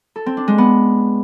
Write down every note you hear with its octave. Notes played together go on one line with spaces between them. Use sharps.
A4
C4
D4
G#3
B3